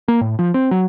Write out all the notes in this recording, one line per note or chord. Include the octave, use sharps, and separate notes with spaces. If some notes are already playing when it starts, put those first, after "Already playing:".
A#3
A2
F3
C4
F#3